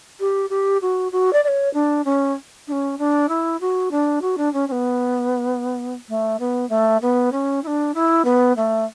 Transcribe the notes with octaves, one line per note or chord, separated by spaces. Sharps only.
G4
G4
F#4
F#4
D5
D5
C#5
D4
C#4
D4
C#4
D4
E4
F#4
D4
F#4
D4
C#4
C#4
B3
A3
B3
A3
B3
C#4
E4
D4
E4
B3
A3